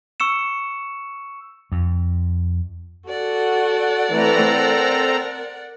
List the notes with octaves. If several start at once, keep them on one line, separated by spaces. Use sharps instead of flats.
C#6 E6 C#7 E7
F2
F#4 A4 D5 F#5
E3 A3 C4 A4 A#5
A#4